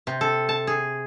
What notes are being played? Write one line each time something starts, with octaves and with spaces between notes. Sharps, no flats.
C3
A4
A5
G#4